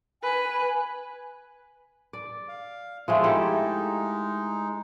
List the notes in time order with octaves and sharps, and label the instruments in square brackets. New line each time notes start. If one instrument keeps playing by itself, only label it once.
[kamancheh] B4 [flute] G#5
[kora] D5
[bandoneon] F5
[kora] F3 G#3 A3 [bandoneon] B3
[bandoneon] G#3 D#4 [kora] E4 G4 A4